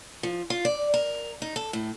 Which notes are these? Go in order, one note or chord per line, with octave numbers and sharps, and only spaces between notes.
F3
F4
D5
A#4
D#4
A4
A2